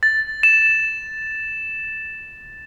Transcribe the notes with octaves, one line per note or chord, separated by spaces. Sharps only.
A6
E7